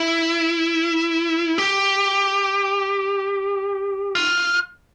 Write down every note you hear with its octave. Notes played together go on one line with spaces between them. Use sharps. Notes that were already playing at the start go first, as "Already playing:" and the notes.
Already playing: E4
G4
F4